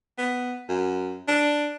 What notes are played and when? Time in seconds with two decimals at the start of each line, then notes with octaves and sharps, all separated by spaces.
0.18 B3
0.69 F#2
1.28 D4